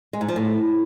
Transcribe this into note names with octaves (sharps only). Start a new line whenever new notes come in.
G#3
G#2
F3
A2